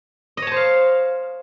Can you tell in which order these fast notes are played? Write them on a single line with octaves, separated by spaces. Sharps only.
D#5 C#5 A5 C5 F5